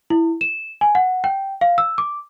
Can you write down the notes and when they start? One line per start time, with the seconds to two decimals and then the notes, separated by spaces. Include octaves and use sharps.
0.10 E4
0.41 E7
0.81 G#5
0.95 F#5
1.24 G5
1.61 F5
1.78 E6
1.98 D6